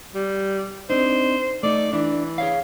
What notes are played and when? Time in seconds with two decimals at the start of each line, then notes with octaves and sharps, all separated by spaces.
0.15 G3
0.90 C4 D4 D#4 C5
1.63 A3 D#4 D5
1.93 E3 D4
2.38 G#4 C#5 F5